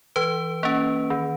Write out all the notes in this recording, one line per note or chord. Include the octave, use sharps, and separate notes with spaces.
E3 B4
A#3 C#4
D#3